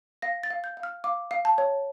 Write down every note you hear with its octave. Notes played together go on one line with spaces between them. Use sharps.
F5 A#6
A6
F5
G6
F5
F6
F5 D6
F5
A5
C#5